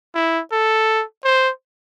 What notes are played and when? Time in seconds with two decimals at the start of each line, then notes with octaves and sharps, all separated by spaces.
0.15 E4
0.52 A4
1.25 C5